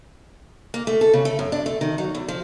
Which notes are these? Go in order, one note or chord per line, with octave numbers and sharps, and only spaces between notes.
A#3
A3
A4
C#3
A3
F#2
D4
A3
D#3
F#3
E2
F3